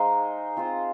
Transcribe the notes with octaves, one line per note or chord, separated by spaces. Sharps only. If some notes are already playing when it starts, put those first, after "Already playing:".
Already playing: G#3 D#4 C5 F5
C4 F4 C5